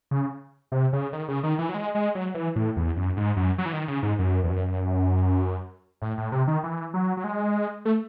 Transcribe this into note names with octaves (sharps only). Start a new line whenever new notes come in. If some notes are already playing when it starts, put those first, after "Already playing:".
C#3
C3
C#3
D#3
C#3
D#3
E3
F#3
G#3
G#3
F#3
E3
A2
E2
F#2
G#2
F#2
F#3
E3
D#3
C#3
G#2
F#2
E2
F#2
A2
A2
C3
D#3
E3
F#3
F#3
G#3
A3